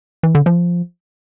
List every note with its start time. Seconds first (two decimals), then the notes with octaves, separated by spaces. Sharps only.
0.23 E3
0.35 D3
0.46 F3